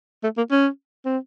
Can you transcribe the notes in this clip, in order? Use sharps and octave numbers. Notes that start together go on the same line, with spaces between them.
A3
A#3
C#4
C4